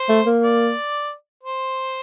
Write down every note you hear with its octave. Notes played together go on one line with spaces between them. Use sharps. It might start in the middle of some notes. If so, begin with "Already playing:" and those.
Already playing: C5
A3
A#3
D5
C5